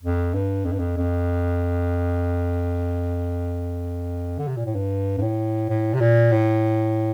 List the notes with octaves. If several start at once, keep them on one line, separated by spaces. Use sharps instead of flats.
F2
G2
F2
G2
F2
F2
D3
C3
A#2
A2
G2
G2
A2
A2
C3
A#2
A2